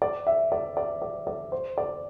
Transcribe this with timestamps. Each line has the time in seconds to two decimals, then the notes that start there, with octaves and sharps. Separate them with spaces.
0.02 D5
0.27 E5
0.52 D5
0.77 D5
1.02 D5
1.27 D5
1.52 C5
1.78 D5